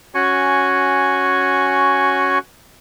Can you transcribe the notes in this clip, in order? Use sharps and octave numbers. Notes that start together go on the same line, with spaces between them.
C#4 F#4 G#5 C#6